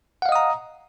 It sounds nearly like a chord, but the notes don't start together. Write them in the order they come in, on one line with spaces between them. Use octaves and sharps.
F#5 F5 D#5 D#6 A#5